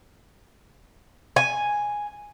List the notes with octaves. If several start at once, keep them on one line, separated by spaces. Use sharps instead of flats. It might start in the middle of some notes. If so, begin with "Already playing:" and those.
G#5